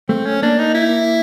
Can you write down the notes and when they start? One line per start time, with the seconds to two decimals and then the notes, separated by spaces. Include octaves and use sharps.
0.09 A3 C4
0.26 C#4
0.42 A#3 D4
0.59 D#4
0.75 E4